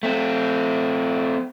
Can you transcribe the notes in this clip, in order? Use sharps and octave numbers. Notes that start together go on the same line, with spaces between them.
A3 C4